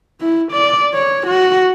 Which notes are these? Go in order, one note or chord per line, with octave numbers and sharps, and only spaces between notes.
E4
D5
C#5
F#4